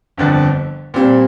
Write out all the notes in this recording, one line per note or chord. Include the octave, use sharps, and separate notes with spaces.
G1 F2 D3
A#2 G3 C4